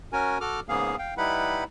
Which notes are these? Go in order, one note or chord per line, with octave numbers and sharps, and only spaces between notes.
C#4 F#4 A#4 G#5
F#4 A4 D6 F6
G#2 C#3 A#3 B3 G#4 F5
F5 G5
G3 D#4 E4 B4 F#5 B5